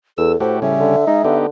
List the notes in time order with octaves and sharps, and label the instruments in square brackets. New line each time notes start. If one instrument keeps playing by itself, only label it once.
[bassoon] E2 [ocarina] A4 [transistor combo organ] E6
[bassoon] A2 [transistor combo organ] A3 F#4 G4 [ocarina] C5
[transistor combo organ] C#3 G3 C#4 [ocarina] E5
[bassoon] D3
[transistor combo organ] G#3 [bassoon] D#4
[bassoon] D3 [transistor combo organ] B3 D#4 G4